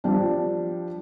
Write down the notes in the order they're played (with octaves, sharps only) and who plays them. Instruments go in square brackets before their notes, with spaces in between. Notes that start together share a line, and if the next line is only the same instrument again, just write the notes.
[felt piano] F3 G3 D4